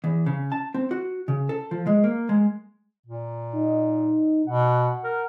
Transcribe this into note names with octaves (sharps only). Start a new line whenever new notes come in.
E2
C#3
A5
C4
F#4
C#3
A4
F3
G#3
A#3
G#3
A#2
D#4
B2 F#5
A#4